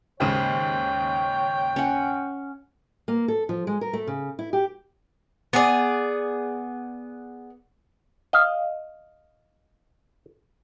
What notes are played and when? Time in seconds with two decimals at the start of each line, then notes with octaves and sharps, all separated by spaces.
0.20 D#2 G#2 C#3 C5 C#5 G5
1.76 C#4 F#5
3.08 A#3
3.28 A4
3.49 F3
3.67 G#3
3.81 A#4
3.93 A3
4.07 C#3
4.39 E4
4.53 G4
5.53 B3 G#4 D5
8.33 D#5 F5